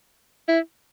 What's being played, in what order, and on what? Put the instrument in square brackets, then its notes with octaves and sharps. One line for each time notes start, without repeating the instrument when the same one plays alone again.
[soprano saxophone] E4